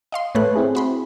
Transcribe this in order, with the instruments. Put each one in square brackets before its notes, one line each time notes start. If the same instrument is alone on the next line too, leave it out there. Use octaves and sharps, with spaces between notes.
[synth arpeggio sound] D#5 F5 C6
[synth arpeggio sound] A2 A3 F#6 [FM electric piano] A4 B4 C#5
[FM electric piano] C4 E4 G#4
[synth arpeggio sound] F#4 B5 C6